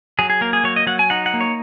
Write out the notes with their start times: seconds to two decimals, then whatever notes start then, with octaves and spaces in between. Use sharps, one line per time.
0.19 F#3 G#4
0.30 G#4
0.41 A#3 A#4
0.53 G#4
0.64 F#3 C#5
0.76 D#5
0.87 F#3 F#5
0.99 G#5
1.10 D#4 F#5
1.26 F#5
1.34 A#3
1.41 C#5